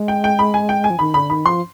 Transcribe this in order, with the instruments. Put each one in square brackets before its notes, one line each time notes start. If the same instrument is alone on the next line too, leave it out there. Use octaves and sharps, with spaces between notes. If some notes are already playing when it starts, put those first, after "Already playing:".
Already playing: [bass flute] G#3
[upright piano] G5
G5
B5
G#5
G5
G#5
[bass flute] F3
[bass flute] D#3 [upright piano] B5
[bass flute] D3 [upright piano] B5
[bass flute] D#3 [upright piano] B5
[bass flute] F3 [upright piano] C6